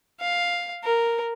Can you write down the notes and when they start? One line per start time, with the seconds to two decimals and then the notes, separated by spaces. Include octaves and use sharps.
0.20 F5
0.84 A#4